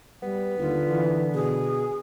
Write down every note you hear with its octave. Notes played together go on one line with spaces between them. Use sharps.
G3 B3
D#2 D3 F4
E3
B2 G#4